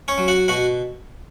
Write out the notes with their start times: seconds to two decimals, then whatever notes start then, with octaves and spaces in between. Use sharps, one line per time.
0.08 C#4 C#5
0.18 F#3
0.28 F#4 F#5
0.48 B2 F#4 F#5